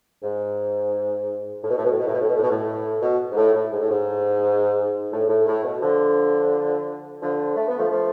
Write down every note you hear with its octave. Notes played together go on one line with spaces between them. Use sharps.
G#2
A2
B2
A2
B2
A2
B2
A2
B2
A2
B2
A2
B2
A2
B2
G#2
A2
A2
G#2
A2
G#2
A2
A2
A2
B2
D3 F3
D3 F3
A3
B3
F3 A3
F3 A3